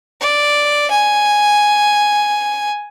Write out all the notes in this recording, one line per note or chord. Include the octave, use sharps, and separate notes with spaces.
D5
G#5